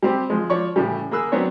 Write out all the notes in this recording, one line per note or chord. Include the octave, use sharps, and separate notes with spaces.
G3 C4 G4
F3 G#3
F3 C#5 D5 C#6
A2 C#3 E3 G3
A#3 G#4 B5 E6 F#6
F#3 B3 C4 D4 C#5